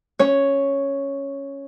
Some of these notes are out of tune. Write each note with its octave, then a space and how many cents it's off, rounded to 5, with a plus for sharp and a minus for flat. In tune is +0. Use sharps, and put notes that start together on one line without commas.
C#4 +0 C#5 +0